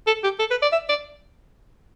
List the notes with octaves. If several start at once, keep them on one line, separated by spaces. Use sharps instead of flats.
A4
G4
A4
B4
D5
E5
D5